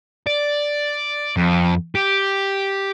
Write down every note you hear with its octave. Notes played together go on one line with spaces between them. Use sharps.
D5
F2
G4